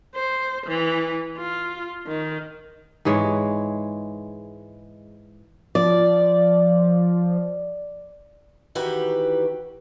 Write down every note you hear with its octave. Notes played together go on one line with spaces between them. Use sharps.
C5
E3
F4
D#3
G#2 E3 G#3 C#5
F3 D5
D#3 E3 F#4 G4 B4